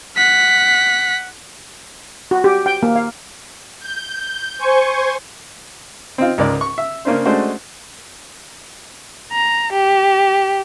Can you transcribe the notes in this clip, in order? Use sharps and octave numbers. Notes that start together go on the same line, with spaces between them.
F#5 B6
F#4
G4
G5
A#3
F5
G6
C5 G#5 C6 C#6
C4 D#4 F4
C#2 G#2 A#4 D5
C#6
E5
C#3 A#3 C#4 D4 C5
G#3 A3 C#4 D4 F#4 C5
A#5
G4